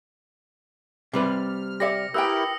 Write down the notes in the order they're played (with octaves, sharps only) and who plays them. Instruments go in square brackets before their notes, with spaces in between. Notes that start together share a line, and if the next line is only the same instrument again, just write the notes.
[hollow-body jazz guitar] C3 G3 B4 [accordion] F6
[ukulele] G4 D5 E5 [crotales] A#6 C#7
[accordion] E4 G4 A#4 [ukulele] B4 E5 G5 [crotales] D#6 E6